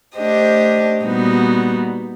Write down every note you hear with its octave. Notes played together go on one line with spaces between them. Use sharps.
A3 D4 G4 C5 D#5
A#2 G3 B3 D#4 F#4